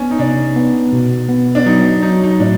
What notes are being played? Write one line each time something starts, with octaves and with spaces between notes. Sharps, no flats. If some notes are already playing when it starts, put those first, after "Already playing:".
Already playing: B3 C#4 D4
D#4
C3 D4
B3
B2
B3
D4
F#3 D#4
F#3 D#4
D#4
A2 D4